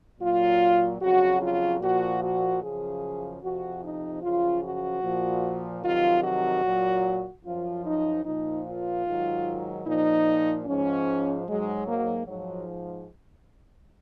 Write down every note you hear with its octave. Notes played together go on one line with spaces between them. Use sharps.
A#2 F#3 F4
F2 C#3 F#3 F#4
F4
A#2 F3 F#4
F#4
F#2 C#3 F3 G#4
F2 C3 F3 F#4
D#4
F#2 C#3 F3 F4
F#4
A#2 F3
F2 C3 D#3 F#3 F4
F#4
A#2 F#3
F#2 F3 F4
D#4
A#2 F3 D#4
F4
G#2 D#3 F#3
A#2 F3 D#4
G#2 F3 C#4
G#2 F#3 G#3
A#3
G#2 F3 F#3